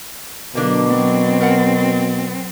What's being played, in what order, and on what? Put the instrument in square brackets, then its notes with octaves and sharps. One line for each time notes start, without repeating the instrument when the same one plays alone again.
[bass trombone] B2 [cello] D3 F#3 [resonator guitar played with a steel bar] A#3 D4
[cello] F#3 C4
[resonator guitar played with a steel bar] A#4 F#5